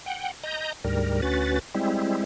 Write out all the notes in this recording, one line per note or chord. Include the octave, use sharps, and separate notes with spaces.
F#5 G5
D#5 A#5 G6
D2 G#2 G3 A#4
D2 C#4 F#4 B4 A6
G3 G#3 C4 E4